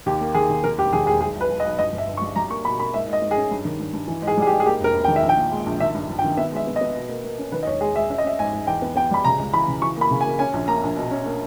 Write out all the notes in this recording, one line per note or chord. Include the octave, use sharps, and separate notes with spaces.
D#2 G4
A#3
D#3 G#4
D#2
D#3 A#4
E1 G4
D#3 G#4
E1 G#4
B1 G#4
B1 B4
B1
D#5
B1
G1 D#5
G1
E5
G1
C#6
G3
G3 A#5
A#3 C#6
B2 B5
A#3 B5
G#2 E5
G#2
D#5
G#2
G#4
C#4
G2
D#3
G2
G2
E3
G#2
G#4
G3 G#4
G4
G#2
G#4
A#3 G4
E1 A#4
E1
D#3 G5
E5
A#1
G5
A#2
G#3
A#1
D#3 E5
G2
G1
G5
D#3
B3 E5
G#3 E5
B3
D#5
B3
B2
A#3
A#3
C#4
D#3 B4
D#5
E1 C#5
G#3 G#4
G#3 E5
C#4 E5
D#5
C#4 E5
G#2 G#5
G#2
E2 G5
B3
B3 G5
G3 B5
C#3 A#5
C#2
E3 B5
C#3
E3 C#6
A#3 B5
C#3
G#5
A#3
C#4 G#5
A#1
A#3 A#5
A#1
B2
C#4
A#3